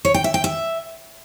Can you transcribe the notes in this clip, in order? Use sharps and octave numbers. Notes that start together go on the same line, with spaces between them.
C#5
G5
E5
G5
E5